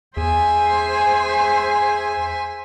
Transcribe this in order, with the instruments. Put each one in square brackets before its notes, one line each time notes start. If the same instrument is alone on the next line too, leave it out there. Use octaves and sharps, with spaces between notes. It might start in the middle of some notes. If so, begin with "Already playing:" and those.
[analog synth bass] E2 [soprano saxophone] G#4 [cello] C5 [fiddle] E5 G#5